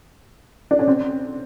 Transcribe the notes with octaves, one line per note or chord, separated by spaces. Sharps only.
D4
C#4
C4